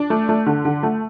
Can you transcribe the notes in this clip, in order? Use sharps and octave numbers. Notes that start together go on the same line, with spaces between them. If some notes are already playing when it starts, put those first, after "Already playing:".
Already playing: D4
A3
A3
D3
D3
A3